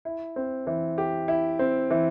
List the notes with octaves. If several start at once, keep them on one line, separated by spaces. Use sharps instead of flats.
E4
C4
E3
G4
E4
C4
E3